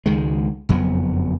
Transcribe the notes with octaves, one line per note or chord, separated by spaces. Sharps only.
C#2 D#3 G#3
F#1 F2 F#3 B3